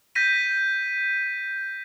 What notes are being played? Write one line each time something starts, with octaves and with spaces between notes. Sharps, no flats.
G6 A#6 B6 D#7